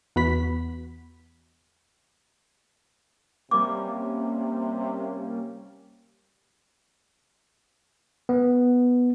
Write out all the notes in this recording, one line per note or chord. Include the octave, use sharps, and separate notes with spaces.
E2 B3 F#4 B5 B6
C3 G3 A#3 C#4 D6
B3